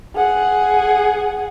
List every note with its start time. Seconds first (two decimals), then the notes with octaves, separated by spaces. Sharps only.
0.16 G#4 F#5